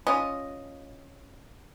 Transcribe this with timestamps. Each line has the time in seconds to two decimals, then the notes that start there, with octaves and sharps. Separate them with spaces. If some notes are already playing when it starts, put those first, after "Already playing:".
0.07 C#4 F4 C#5 D#5